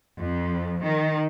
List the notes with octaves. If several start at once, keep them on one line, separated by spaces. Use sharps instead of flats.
F2
D#3